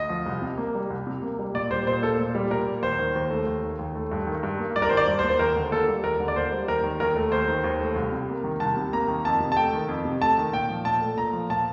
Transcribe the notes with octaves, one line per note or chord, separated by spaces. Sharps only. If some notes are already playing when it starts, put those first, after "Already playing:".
Already playing: D2 D#5
F3
C2
C3
A#3
G3
C2
C3
A#3
G3
A#2 D5
G3 C5
A#2 C5
A#3 A4
A#2
G3
A#2 A#4
A#3
D#2 C5
D#3
D#2
A3
D#2
D#3
D#2
A3
G2
D#3
G2
A#3
G2 D5
A#4
D#3 C5
D5
G2
C5
A#3
C5
D#2 A#4
D3
A#3 A4
G3
D#2 A#4
D3
D5
A#3 C5
G3
D#2 A#4
D#3
D#2 A#4
A3
D#2 C5
D#3
D#2
A3
C2
C3
A#3
D#3
C2 A5
C3
A#3 A#5
D#3
F2 A5
C3
A5
A3 G5
D#3
F2
C3
A3 A5
D#3
A#2 G5
F3
A#2 A5
A3
A#2 A#5
F3
A#2 A5